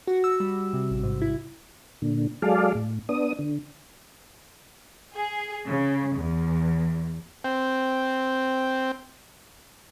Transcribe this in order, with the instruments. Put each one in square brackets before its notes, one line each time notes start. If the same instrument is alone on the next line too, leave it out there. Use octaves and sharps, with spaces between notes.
[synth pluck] F#4
E6
G3
C3
A1
G#2
E4
[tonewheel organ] A#2 D3
F#3 G#3 G#4 A4 D5 F5
A2
B3 D4 D#6
D3
[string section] G#4
C#3
E2
[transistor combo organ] C4 G5